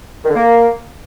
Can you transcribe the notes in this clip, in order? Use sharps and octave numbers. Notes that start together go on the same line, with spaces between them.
D#3
D3
A#3